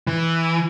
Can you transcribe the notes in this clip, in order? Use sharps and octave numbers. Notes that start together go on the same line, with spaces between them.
E3